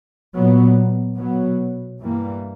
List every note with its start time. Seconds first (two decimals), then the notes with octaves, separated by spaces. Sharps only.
0.35 A#2 F#3 B3
1.18 B2 F#3 B3
2.00 G2 E3 G3 A#3